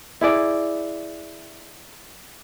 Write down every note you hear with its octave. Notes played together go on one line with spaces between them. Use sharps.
E4 G#4 D5